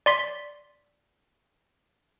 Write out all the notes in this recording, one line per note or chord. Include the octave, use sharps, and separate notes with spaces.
D5 C6 B6